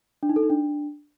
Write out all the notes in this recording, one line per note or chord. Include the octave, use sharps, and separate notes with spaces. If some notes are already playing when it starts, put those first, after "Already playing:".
D4
D#4
A4
D#4
D4